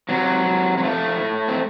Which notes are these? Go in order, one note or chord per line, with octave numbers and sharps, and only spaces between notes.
C3 F#3
C3
F#3
F3 A3
A2
C4